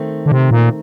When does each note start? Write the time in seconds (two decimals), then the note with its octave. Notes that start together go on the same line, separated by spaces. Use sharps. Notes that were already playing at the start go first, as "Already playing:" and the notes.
Already playing: D#3 A3 C4
0.26 D3
0.32 C3
0.51 A#2